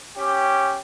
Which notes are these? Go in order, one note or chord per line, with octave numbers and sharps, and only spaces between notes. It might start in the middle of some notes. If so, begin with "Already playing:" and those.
C#4 G4